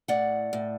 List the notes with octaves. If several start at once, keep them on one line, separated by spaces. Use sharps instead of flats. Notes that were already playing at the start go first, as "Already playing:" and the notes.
A2 D5 F#5
A2